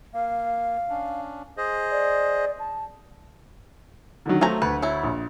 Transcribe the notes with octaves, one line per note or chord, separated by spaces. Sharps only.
A#3 F5
C#4 D4
G#4 C5 D#5
D5
A5
D3 D#3 F#3
F3 F#3 A3 G#5 A#5
D2 B4
F#3 E4
A#1